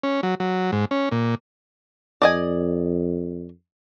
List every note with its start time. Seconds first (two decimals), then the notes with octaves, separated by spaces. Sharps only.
0.03 C#4
0.23 F#3
0.40 F#3
0.72 G#2
0.91 C#4
1.11 A#2
2.22 F2 D5 D#5 G#5